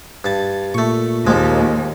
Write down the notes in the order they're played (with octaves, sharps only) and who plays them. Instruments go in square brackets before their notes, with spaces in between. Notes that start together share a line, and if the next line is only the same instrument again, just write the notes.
[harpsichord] G2 A5
[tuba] A#2 [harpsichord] A3 C#6
[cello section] D#2 [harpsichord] F3 G#3